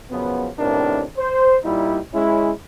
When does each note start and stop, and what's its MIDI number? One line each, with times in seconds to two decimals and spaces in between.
0.11 0.48 42
0.11 0.48 49
0.11 0.48 53
0.11 0.48 59
0.59 1.02 45
0.59 1.02 48
0.59 1.02 51
0.59 1.02 59
0.59 1.02 62
0.59 1.02 70
1.18 1.58 72
1.64 1.98 46
1.64 1.98 55
1.64 1.98 63
1.64 1.98 64
2.14 2.50 56
2.14 2.50 61
2.14 2.50 64